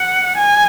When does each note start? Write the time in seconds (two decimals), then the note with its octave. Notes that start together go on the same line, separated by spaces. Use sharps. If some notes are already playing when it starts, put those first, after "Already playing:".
Already playing: F#5
0.37 G#5